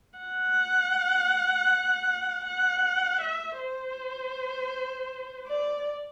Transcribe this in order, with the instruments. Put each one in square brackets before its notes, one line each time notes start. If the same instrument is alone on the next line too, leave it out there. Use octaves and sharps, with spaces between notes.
[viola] F#5
F#5
E5
C5
D5